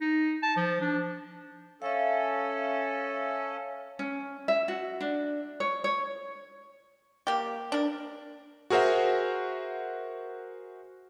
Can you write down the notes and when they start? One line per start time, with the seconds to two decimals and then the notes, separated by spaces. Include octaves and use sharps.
0.01 D#4
0.42 A5
0.56 F3
0.81 D4
1.82 C#4 A4 E5 F5
3.99 C#4
4.48 E5
4.68 F#4
5.01 D4
5.60 C#5
5.84 C#5
7.27 A#3 G4
7.72 D4 A#4
8.70 F#4 G#4 A#4 C5 E5 F#5